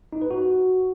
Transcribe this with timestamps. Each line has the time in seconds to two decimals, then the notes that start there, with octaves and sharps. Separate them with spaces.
0.13 D#4
0.22 B4
0.31 F#4